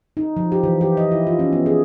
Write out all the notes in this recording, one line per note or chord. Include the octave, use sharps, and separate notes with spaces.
D#4
F3
G4
E3
G4
D#5
E4
F4
C#4
B3
G#4